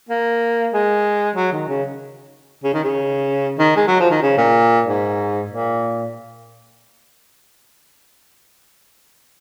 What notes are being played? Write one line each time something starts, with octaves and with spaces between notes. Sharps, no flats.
A#3
G#3
F#3
D#3
C#3
C#3
D#3
C#3
D#3
G#3
F#3
F3
D#3
C#3
A#2
G#2
A#2